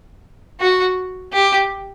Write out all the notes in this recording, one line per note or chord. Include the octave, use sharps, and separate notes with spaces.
F#4
G4